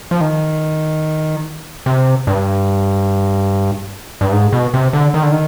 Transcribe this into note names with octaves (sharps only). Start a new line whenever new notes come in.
F3
D#3
C3
G2
G2
G#2
B2
C3
D3
D#3
D3
D#3